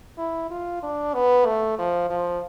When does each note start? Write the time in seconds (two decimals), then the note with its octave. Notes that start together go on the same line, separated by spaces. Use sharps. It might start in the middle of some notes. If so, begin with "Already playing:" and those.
0.17 E4
0.50 F4
0.83 D4
1.14 B3
1.46 A3
1.79 F3
2.10 F3